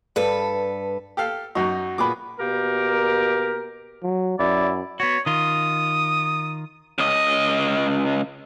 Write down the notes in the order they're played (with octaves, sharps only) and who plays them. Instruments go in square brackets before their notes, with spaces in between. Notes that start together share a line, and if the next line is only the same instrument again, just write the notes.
[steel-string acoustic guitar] G2 A4 B4
[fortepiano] G4 A4 F5
[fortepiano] F#2 D#4 [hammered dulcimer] F#4
[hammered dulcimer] A#2 B5 [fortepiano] B3 G#4 D6
[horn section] B2 A#3 G4 A#4
[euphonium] F#3
[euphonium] F#2 [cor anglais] E4 [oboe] D5
[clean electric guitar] B3 F#4 [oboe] C#5
[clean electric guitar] D#3 F4 [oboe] D#6
[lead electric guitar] C#2 D#5